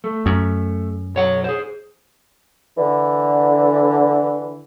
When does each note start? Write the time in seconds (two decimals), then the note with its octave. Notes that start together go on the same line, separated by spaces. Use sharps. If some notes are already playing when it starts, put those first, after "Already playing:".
0.04 A3
0.26 F#2
1.15 B1 C#5 F#5
1.44 G#4 C5
2.77 D3 E3